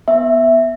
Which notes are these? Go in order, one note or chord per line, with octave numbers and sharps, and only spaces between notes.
B3 E5